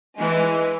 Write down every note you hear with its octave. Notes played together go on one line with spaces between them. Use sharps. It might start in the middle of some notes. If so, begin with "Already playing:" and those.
E3 G#3